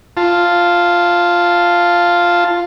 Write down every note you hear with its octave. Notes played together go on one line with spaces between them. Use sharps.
F4 A5